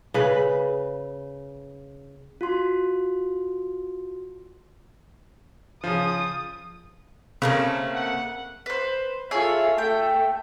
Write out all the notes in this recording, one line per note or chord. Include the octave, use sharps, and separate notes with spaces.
C#3 B4
F4 F#4 C6
C#3 F3 D#6
C#3 A3 A#3 C4
F#5
B4 C5
F4 G#4 A4 C#5 E5
A3 G5